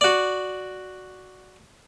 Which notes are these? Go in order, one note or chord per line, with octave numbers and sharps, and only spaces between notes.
F#4 D5